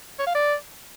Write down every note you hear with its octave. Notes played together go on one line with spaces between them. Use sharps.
C#5
F5
D5